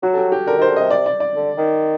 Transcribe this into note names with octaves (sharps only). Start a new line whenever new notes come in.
F#3 F#4
A4
G4
G4
D3 A#4
D#3
C5
D3
C3 D#5
C3 D5
D5
D5
D3
D#3